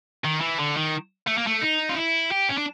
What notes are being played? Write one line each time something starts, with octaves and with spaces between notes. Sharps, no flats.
D#3
E3
D3
D#3
A3
A#3
A3
D#4
F4
E4
G4
C#4
D4